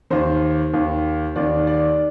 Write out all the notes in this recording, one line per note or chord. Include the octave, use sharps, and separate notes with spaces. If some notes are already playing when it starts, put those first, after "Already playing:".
D#2 D#3 C5
D#2 D#3
D#2 D#3 D5
D5